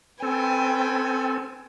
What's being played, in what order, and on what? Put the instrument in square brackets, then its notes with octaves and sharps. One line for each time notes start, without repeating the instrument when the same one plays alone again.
[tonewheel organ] C4 A4 [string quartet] B4 G5 G#5